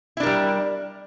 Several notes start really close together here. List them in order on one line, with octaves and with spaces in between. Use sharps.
E4 D4 A#4 G3